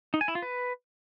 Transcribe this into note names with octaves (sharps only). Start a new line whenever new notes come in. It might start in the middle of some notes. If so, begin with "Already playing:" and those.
D#4
G#5
E4
F4
B4